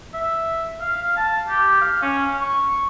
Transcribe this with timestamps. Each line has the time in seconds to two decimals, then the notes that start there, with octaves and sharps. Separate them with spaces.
0.14 E5
0.81 F5
1.17 A5
1.49 G4
1.81 F5
2.02 C#4
2.42 C#6